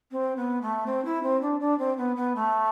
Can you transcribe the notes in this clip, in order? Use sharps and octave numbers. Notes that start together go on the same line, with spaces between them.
C4
B3
A3
C4
E4
C4
D4
D4
C4
B3
B3
A3